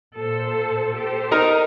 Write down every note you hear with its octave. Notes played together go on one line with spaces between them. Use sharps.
A#2 A4 C5
G4 A4 C5
D#4 A#4